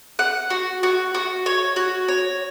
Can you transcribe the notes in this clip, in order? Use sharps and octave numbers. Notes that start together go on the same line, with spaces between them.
F#5
F#4
F#4
F#4
C#5
F#4
C#5